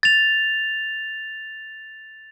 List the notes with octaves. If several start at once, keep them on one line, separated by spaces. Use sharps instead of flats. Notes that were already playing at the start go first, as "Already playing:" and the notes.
A6 F7